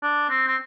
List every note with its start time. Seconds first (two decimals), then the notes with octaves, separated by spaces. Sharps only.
0.03 D4
0.30 C4
0.47 C4